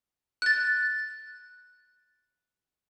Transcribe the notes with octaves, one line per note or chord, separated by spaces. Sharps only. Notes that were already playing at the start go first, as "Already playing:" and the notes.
F#6 A6